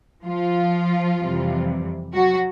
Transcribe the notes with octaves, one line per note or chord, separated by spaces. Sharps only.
F3 F4
F2 C3 E3 G3
F#3 F#4